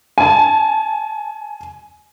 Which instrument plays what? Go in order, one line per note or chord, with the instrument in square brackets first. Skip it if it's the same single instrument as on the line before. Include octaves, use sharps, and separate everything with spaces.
[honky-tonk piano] G#5 A5